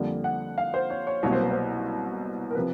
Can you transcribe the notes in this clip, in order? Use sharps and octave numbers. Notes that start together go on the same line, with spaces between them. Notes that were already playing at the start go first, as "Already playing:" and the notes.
Already playing: F2 D3 G3 A#3
F#5
F5
C5
C#5
C#5
C2 B2 F#3 A#3 C#5
C5
B4
C5
A#4
C3 F3 B4